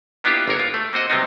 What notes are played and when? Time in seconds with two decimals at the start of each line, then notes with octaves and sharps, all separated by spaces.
0.24 A#3 B3 D4 E4 F4 G4
0.48 G1 A#3 A#4 C#5
0.59 F4
0.74 A3
0.93 A#3 C4 F#4 D#5
1.10 C3 F#3 G3 B3 C4 D#4